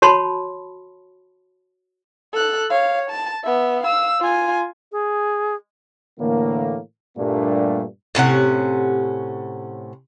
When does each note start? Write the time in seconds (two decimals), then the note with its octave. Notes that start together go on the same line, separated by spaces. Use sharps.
0.02 F#4 C#5 A5 B5 C6
2.33 A4 F#6
2.70 C#5 F5
3.10 A5
3.44 B3 E5
3.83 F5 E6
4.20 F4 G#5
4.92 G#4
6.20 A2 D3 E3 A#3
7.18 G2 A#2 G3 A3 A#3 D4
8.15 A2 C3 C#4 F#5